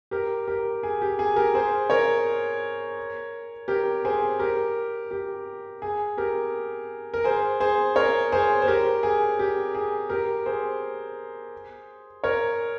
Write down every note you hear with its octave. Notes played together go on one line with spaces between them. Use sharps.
G4 A#4
G4 A#4
G#4
G4
G#4
G4 A#4
G#4 C5
A#4 C#5
G4 A#4
G#4 C5
G4 A#4
G4
G#4
G4 A#4
A#4
G#4 C5
G#4 C5
A#4 C#5
G#4 C5
C5
G4 A#4
G#4
G4
G#4
G4 A#4
G#4 C5
A#4 C#5